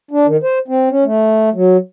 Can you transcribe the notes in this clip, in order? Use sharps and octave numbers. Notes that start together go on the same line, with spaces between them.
D4
D#3
C5
C4
C#4
A3
F#3